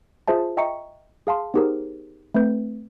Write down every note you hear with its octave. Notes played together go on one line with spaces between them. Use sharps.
F4 G#4 C5 E5 A5
D#5 E5 G5 A#5 C#6 C#7
G#4 F5 A5 C6
B3 D#4 G4 G#4 A#4 C5
A3 C4 B4 G6